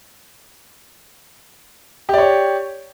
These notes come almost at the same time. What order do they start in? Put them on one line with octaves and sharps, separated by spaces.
G4 D5 C#5